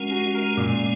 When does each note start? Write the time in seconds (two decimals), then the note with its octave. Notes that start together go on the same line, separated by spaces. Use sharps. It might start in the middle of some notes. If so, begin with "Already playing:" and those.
Already playing: G#3 C#4 F#4 A#4
0.12 F#4
0.35 A#4
0.57 A#2